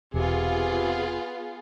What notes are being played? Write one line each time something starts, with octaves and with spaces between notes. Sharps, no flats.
E1 C3 B3 F4 G#4